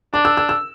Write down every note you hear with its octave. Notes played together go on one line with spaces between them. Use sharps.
D4 D6
E6
E6
E6